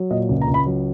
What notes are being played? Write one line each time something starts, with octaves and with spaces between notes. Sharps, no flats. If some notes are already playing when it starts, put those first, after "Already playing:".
Already playing: F#3
A#2 D#5
C#2
A#5
C#2
B5
F#3